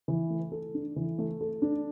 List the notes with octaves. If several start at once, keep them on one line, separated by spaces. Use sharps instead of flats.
E3
A3
A4
D4
E3
A3
A4
D4